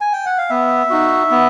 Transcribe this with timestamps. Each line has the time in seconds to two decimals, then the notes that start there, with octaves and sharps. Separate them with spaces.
0.01 G#5
0.13 G5
0.26 F#5
0.38 F5
0.49 B3 E5
0.90 D#4 F#4
1.31 B3